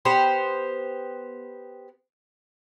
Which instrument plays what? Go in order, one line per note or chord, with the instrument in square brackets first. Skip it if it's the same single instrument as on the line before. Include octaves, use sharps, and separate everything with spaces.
[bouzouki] B3 G4 C5